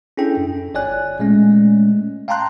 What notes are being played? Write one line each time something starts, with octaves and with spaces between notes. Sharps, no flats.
C#4 D4 E4 G#4 A4 G5
F#2
G1 C#5 D5 G#5 F#6
A#2 G#3 A3 C#4
F5 G5 A5 A#5 C6 F#6